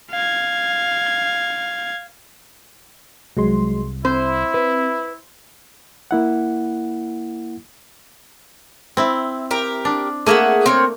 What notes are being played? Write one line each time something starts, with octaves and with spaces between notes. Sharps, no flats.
F5 G#6
C2 F#3 G#3 C6
C4 E4 C5
B4
A#3 E4 F#5
C4 E4
G4 A#4
D4
A3 A#3 G#4 E5 F#5
C4 A#4 C#5